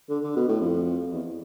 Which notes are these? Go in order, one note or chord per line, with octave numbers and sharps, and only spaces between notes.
D3
D3
B2
A2
F2
E2